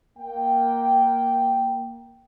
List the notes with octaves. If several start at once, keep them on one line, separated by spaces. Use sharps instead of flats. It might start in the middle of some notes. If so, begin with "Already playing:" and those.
A#3 G5